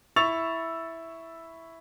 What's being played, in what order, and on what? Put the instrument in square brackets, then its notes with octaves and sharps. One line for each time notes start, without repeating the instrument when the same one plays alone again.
[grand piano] E4 C#6 E6 A6 F7